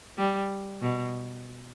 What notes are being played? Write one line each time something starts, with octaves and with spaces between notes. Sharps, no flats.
G3
B2